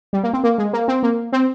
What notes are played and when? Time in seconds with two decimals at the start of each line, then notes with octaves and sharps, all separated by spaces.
0.13 G3
0.23 A#3
0.33 C4
0.43 A#3
0.58 G#3
0.73 A#3
0.88 C4
1.03 A#3
1.32 C4